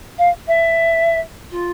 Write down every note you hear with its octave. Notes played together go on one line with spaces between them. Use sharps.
F5
E5
F4